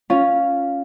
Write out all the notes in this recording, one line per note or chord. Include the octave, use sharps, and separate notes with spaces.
C#4 F4